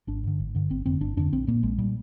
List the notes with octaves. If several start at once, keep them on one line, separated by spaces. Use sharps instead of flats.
G#1 D4
G2 D3
G#1
G2 D3
G1 C4
F2 D3 C4
G1 D4
F2 D3 D4
A#1 C4
A#2 A#3
A#1 G#3
A#2 G3